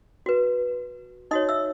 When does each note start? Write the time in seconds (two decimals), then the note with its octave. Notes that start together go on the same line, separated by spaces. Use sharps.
0.26 F#4 B4
1.31 D#4 F#4 C#5 D#5 D#6
1.49 E5 E6